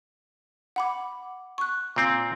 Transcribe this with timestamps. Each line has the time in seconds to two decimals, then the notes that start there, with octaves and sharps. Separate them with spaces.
0.76 F#5 B5 D6
1.58 C#6 F#6
1.96 A#2 C4